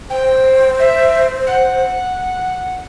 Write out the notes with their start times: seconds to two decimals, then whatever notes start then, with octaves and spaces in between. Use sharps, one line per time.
0.09 C5 G5
0.78 E5
1.46 F#5